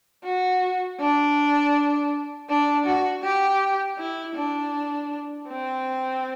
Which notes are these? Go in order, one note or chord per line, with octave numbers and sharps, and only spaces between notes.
F#4
D4
D4
F#4
G4
E4
D4
C4